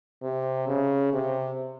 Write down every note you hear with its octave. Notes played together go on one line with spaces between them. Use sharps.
C3
C#3
C3